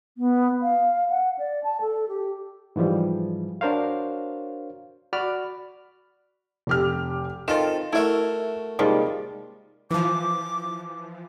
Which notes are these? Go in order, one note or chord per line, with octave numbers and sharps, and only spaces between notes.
B3
F5
F#5
D5
A5
A4
G4
G#2 E3 F3 G3
D4 F#4 A#4 C5 C#5 F5
F#4 D5 B5 F6
F1 G4 F6
D#3 C4 F4 A4 E7
A3 E4 F#4 A#4 E5
C3 D#3 F3 G3 G#3 A#3
E3 F3 D6